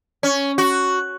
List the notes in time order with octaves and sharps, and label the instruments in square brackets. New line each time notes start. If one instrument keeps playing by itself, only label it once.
[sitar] C#4
F#4